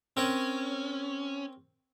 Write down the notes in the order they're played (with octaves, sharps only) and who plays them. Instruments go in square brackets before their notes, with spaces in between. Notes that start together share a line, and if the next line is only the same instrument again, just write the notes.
[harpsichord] C4 A#4 C#5 [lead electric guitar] C#4